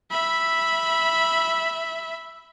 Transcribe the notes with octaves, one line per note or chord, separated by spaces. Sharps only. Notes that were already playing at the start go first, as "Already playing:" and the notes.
E5 B5